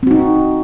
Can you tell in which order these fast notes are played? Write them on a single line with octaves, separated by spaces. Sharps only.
C4 F#4 D#4